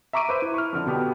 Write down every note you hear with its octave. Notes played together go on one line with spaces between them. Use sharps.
E5 A#5 C#6 D6 D7 D#7
B4 C5 E5
E4
C#6 F6
F2 D3
B2 B3 G4